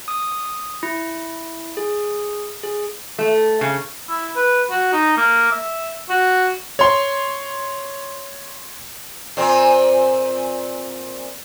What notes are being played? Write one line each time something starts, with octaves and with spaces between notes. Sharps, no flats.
D#6
E4
G#4
G#4
A3
C#3
E4
B4
F#4
D#4
A#3
E5
F#4
C#5 C6
A#2 C4